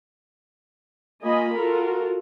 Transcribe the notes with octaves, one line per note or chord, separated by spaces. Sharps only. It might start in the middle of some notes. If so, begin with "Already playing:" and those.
A#3 F4 D#5 G#5 B5
F4 F#4 A4 A#4